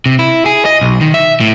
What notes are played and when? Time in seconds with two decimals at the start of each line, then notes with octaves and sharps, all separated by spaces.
0.06 C3
0.19 E4
0.46 G#4
0.66 D#5
0.81 B1
1.01 D#3
1.14 E5
1.40 A2